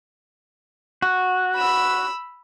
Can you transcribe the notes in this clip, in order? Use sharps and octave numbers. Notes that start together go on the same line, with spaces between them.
F#4
B5 E6